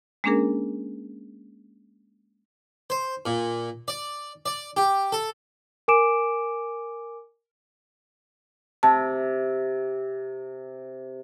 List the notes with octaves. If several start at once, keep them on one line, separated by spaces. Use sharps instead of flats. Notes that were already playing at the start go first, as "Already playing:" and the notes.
G#3 A#3 C#4 D4 G#4 A#4
C5
A#2
D5
D5
G4
A4
A#4 G#5 D6 D7 E7
C3 A5